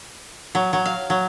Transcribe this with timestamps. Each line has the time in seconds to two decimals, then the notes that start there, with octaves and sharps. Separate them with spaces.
0.55 F#3
0.73 F#3
0.86 F5
1.10 F#3